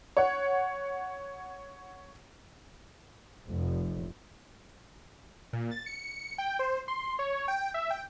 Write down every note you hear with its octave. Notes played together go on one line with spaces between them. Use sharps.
C#5 F#5
F1
A#2
A6
C#7
G5
C5
C6
C#5
G5
E5
G5